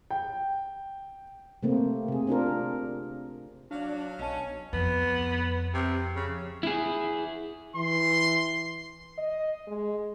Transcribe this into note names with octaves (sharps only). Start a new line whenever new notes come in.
G5
C3 A3 A#3 C4
C3 G#4
C4 D4 F4 A#4
F#3 D4 F5
B1 C#4 D#5 A5
F2 B3
C3
C#3
E4 G#4
E3 C6
D#5
G#3